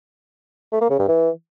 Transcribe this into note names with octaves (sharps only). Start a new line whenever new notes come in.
A3
A#3
C#3
G2
E3